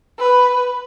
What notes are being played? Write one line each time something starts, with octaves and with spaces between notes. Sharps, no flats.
B4